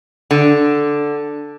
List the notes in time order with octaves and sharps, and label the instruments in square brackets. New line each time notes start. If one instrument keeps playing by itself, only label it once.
[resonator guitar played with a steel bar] D3